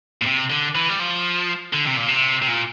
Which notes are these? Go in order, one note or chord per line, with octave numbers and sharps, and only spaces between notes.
A#2
C3
D3
E3
G3
F3
D3
C3
A#2
C3
C3
A#2